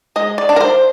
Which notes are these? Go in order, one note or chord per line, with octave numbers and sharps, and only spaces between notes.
G#3 D#5
D5
D4
A#4
C5